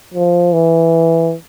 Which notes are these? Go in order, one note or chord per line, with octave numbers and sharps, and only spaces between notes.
F3
E3